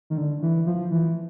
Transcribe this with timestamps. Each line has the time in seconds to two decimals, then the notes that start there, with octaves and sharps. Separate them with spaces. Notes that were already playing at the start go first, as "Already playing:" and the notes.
0.10 D#3
0.17 D3
0.42 E3
0.66 F3
0.91 E3